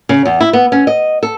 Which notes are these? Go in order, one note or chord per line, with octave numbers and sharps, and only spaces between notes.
C#3
E2
E4
B3
C#4
D#5
A4